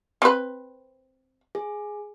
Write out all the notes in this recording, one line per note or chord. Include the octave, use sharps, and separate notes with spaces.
C4 B4
G#4